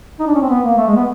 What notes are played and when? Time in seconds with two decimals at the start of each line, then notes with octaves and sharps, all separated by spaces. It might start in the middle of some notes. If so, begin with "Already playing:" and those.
0.20 D#4
0.27 D4
0.35 C#4
0.42 C4
0.49 B3
0.64 A#3
0.78 A3
0.88 G#3
0.96 B3